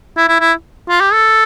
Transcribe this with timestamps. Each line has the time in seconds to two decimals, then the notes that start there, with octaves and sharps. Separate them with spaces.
0.17 E4
0.28 E4
0.40 E4
0.89 F4
1.00 G4
1.13 A4